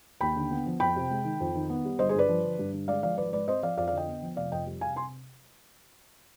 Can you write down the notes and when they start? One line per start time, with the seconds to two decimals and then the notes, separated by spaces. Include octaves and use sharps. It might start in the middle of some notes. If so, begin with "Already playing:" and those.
0.21 D#2 G5 B5
0.36 D3
0.51 B3
0.66 F3
0.80 F2 G5 B5
0.96 C3
1.11 G#3
1.25 D#3
1.40 F2
1.55 D#3
1.70 B3
1.85 G3
1.99 G1 C5 D#5
2.09 G#4 C5
2.15 G2 B4 D5
2.29 F3
2.44 D3
2.59 G2
2.73 D3
2.88 G#3 D5 F5
3.03 F3 D5 F5
3.18 G#1 B4 D5
3.32 G#2 B4 D5
3.48 C4 C5 D#5
3.63 F3 D5 F5
3.77 F2 D5 F5
3.88 D5 F5
3.93 D3 D#5 G5
4.08 B3
4.22 F3
4.36 F1 D5 F5
4.52 F2 D#5 G5
4.66 G3
4.81 C3 F5 G#5
4.96 G#5 C6